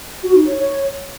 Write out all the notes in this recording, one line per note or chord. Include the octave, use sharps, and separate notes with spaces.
F#4
D#4
C#5
C#5